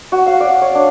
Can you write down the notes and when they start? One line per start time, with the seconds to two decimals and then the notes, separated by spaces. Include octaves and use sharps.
0.12 F#4
0.26 F5
0.40 D5
0.62 C#5
0.75 D4